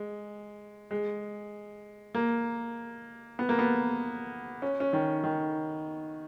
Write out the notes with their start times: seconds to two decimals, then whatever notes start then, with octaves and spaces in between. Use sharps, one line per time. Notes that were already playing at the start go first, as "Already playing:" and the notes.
Already playing: G#3
0.91 G#3
2.15 A#3
3.39 B3
3.49 A#3
3.59 B3
4.62 C#4
4.80 C#4
4.93 D#3
5.24 D#3